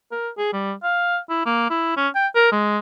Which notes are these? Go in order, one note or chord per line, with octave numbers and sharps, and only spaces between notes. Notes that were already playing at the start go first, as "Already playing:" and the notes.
A#4
G#4
G3
F5
E4
A#3
E4
C#4
G5
A#4
G#3